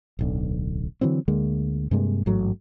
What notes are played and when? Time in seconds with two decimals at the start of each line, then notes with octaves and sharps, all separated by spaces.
0.19 D1 B1 D3
1.01 D3 E3 F#3 C4
1.28 D2 D3 G#3 A#3
1.91 G2 C3 G#3 A#3
2.26 A1 G#2 F#3 A3